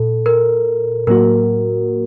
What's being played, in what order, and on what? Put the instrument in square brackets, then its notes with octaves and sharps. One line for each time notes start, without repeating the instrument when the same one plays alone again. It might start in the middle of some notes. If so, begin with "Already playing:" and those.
Already playing: [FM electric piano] A#2 [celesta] A4
[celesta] A#4
[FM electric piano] A2 F#3 A#3 F#4 [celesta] A#4